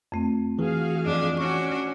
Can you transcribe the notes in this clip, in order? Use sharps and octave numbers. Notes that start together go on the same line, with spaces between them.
F2 A3 C4
E3 F#4 G#4 F5
F2 D4 D#5
C#4 D4 F#4 C#6